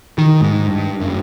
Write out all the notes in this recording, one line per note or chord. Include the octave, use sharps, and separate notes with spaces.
D#3
G#2
G2
F#1